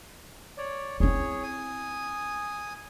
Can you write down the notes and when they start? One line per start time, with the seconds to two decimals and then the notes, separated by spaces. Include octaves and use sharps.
0.58 C#5 D5
1.00 C4 E4 G#4 C#5
1.43 G#5 D#6